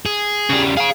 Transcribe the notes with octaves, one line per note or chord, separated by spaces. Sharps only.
G#4
C#3 G3
G#4 F5 G#5